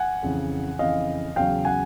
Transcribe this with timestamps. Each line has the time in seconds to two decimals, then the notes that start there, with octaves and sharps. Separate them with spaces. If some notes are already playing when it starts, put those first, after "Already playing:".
Already playing: F#5 G#5
0.23 F2 C#3 E3
0.79 F2 C#3 E3 D#5 F5
1.36 E2 C#3 F#3 F5 G5
1.65 F#5 G#5